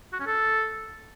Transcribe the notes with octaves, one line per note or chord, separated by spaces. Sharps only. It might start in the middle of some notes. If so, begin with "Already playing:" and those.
F#4
C#4
A4